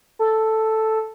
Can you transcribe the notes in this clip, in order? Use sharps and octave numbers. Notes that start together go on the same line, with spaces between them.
A4